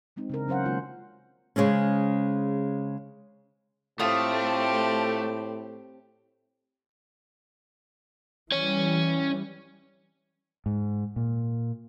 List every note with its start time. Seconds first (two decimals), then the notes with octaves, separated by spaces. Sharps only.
0.16 E3 G#3 C4 D#4
0.30 C#3 D4 A#4
0.48 F#3 C#4 C5 F5 F#5
0.65 D#3 G#3 A#3 F4
1.56 C#3 G#3 C4 C#4
3.99 A2 A3 C4 F4 G4 D#6
8.52 E3 G3 C#4 C#5
10.66 G#2
11.16 A#2